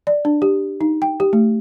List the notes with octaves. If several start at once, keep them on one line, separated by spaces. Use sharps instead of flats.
D5
D4
G4
D#4
G5
G4
A3